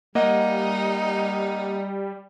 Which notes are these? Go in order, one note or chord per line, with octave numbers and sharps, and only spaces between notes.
G3 A#3 D#4 D#5 F#5